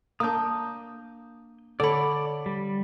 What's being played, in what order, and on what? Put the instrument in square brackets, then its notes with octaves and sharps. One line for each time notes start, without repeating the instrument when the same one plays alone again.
[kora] A#3 D4 [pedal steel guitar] D#6 G6
[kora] D3 C#5 [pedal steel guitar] D5 B5
[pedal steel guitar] G3